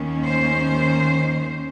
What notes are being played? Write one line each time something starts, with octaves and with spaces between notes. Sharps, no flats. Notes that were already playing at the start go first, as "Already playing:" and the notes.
Already playing: D#2 D#3 A#3 C#4
C5